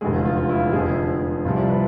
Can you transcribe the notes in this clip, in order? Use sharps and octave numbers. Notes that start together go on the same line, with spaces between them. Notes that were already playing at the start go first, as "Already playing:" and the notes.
F1 E2 D3 G#3 G#4
F4
F4
F4
E4
G#4
F1 F2 D3 F3 G#4
C2 C3 F3 F4
D5
B4